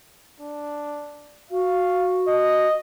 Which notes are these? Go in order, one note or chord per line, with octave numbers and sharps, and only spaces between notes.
D4
F#4 F5
D#5